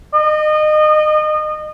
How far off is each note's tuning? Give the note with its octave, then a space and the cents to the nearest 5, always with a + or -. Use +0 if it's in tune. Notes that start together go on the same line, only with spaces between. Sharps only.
D#5 -30